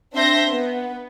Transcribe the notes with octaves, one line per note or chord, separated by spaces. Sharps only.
C4 D4 E5 C6 G6 A#6
B3